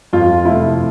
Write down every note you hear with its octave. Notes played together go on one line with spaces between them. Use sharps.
F2 F4
C3 F3 A3 E4